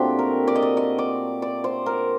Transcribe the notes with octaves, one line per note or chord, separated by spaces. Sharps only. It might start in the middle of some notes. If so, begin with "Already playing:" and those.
Already playing: A#2 F#3 A3 C4 D4 G4
A#4
D5
D#5
D5
D#5
D5
D5
C5
A#4